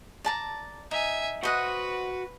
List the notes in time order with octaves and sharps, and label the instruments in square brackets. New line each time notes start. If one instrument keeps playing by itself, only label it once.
[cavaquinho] D5 A5 A#5
[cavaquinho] D#4 [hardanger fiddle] E5 G#5
[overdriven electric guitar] F#4 [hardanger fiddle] B4 [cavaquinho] C5 D#5 F#5